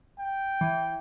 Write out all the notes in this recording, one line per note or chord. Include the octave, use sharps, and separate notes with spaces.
G5
E3